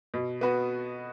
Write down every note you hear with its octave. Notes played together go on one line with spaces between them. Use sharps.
B2
B3 F#4 B4